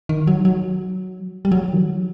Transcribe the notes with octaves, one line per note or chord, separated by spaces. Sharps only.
D#3
F#3
F#3
G3
F#3
D#3
F#3